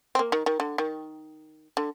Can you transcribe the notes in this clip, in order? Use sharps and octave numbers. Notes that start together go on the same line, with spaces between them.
C4
A#3
D#3
D#3
D3
D#3
D3